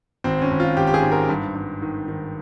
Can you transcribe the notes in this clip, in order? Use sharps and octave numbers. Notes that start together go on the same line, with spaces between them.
G#1 C4
C#4
G#1
F4
G#1 G4
G4
G#4
G#2
A#4
G2
G2
D#3
D#3